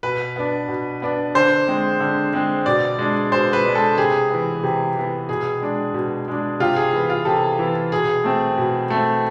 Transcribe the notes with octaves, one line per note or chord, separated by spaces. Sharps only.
B2 B4
B3 D4
B2
B3 D4
D3 C5
G#3 C4
D3
G#3 C4
B2 D5
G#3 D4
B2 C5
B4
G#3 D4
A4
C3 G#4
E3 B3
C3
E3 B3
B2 G#4
G#3 D4
B2
G#3 D4
C3 F4
G#4
E3 B3
F4
C3 A4
E3 B3
B2 G#4
A3 C4
B2
A3 C4